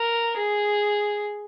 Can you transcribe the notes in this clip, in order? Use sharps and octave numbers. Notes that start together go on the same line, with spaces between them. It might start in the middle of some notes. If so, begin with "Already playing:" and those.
Already playing: A#4
G#4